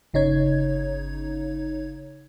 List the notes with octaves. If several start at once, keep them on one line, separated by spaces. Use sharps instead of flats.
G1 C#3 D#4 C#5 G#6